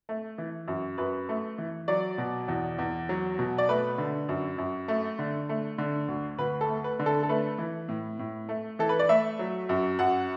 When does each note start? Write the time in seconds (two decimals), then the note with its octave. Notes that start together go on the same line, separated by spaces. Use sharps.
0.09 A3
0.38 E3
0.68 F#2
0.98 F#2 B4
1.29 A3
1.58 E3
1.88 F#3 D5
2.18 B2
2.48 E2
2.79 E2
3.09 F#3
3.39 B2
3.58 D5
3.69 A3 B4
3.98 D3
4.29 F#2
4.58 F#2
4.88 A3
5.19 D3
5.49 A3
5.78 D3
6.08 D2
6.38 D2 B4
6.61 A4
6.69 A3
6.84 B4
6.99 D3
7.06 A4
7.23 A4
7.29 A3 B4
7.58 E3
7.89 A2
8.19 A2
8.49 A3
8.79 E3 A4
8.89 B4
8.99 D5
9.09 A3 E5
9.39 F#3
9.69 F#2
9.99 F#2 F#5